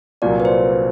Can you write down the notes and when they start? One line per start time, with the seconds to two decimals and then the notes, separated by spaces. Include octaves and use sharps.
0.22 C2 A#2 F#3 A#3 D5
0.40 B4
0.45 C5